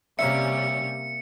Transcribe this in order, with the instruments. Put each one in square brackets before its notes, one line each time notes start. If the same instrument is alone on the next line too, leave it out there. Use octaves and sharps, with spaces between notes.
[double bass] C3 [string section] G3 C#4 [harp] A#3 E5 [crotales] C#7